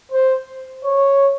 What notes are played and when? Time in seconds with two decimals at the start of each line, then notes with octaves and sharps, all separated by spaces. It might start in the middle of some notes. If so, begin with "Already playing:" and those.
0.11 C5
0.84 C#5